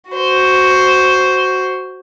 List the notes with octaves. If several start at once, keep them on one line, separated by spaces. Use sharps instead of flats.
F#4 C5